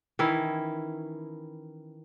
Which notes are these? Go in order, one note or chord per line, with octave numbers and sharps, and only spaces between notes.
D#3 E3 C#4 E4